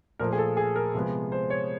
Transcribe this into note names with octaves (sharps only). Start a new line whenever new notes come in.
A#2 F3 A3 A#4
G#4
A4
G#4
A#4
C3 F3 G#3 B3
C5
C#5